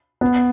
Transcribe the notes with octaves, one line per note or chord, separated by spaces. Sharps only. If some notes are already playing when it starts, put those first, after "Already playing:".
B3